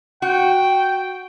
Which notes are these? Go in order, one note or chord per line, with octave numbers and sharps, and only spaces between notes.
F#4 G5